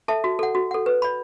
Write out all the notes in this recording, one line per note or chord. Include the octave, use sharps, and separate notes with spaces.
A4 E5 A5
F#4
A4 F#5
F#4
A4 F#5
B4
D5 B5